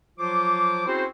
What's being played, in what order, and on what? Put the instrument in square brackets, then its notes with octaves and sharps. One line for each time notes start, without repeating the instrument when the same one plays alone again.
[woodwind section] F3 F#3 F4 C5 D6
C4 C#4 E4 F#4 G#4 C5